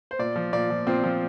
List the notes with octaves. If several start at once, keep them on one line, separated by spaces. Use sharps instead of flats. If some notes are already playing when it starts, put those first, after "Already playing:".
C5
A#2 D5
F3
A#2 D5
F3
A#2 C4
F3